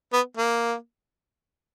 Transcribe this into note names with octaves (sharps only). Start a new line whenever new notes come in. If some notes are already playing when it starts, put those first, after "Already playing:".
B3
A#3